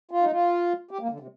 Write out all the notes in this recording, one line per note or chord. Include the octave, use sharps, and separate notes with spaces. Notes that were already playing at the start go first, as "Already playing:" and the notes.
F4
D#4
F4
G4
A#3
D3
C3